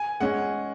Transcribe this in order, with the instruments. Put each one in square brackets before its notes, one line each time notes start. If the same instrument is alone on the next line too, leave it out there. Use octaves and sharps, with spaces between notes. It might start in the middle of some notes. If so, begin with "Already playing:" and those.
Already playing: [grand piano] G#5
[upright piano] G#3 C#4 [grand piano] F#5